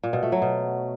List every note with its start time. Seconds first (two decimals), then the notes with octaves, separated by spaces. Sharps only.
0.03 A#2
0.13 B2
0.23 A3
0.32 F#3
0.42 B2